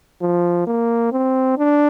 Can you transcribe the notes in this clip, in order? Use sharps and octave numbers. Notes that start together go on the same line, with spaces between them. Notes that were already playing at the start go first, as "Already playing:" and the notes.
F3
A#3
C4
D4